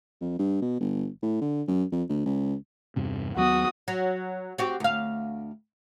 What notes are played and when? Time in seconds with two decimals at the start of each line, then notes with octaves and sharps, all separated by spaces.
0.21 F2
0.39 G2
0.62 B2
0.80 G1
1.22 A2
1.41 D3
1.68 F#2
1.92 F2
2.09 D2
2.25 C#2
2.96 E2 G2 C3
3.36 D#2 F#3 B3 F#4 D#6
3.88 F#3
4.58 C4 F#4 G4
4.80 D2 F5